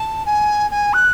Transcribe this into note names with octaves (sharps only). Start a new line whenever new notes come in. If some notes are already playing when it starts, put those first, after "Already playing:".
Already playing: A5
G#5
G#5
F#6